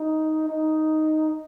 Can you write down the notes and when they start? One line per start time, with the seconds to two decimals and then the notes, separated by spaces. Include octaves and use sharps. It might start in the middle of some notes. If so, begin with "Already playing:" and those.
Already playing: D#4
0.49 D#4